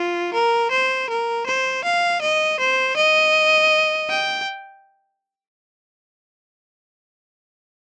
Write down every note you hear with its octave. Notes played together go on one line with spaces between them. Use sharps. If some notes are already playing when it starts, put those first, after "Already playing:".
Already playing: F4
A#4
C5
A#4
C5
F5
D#5
C5
D#5
G5